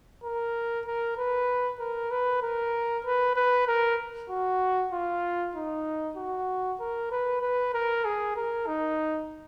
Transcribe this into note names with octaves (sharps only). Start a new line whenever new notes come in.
A#4
A#4
B4
A#4
B4
A#4
B4
B4
A#4
F#4
F4
D#4
F#4
A#4
B4
B4
A#4
G#4
A#4
D#4